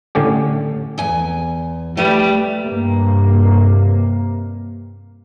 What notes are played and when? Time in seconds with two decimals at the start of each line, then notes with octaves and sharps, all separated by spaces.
0.15 A2 D3 C#4 G4
0.98 E2 G#5
1.97 G3 A3 G4 B4
2.63 G2 C3 A#3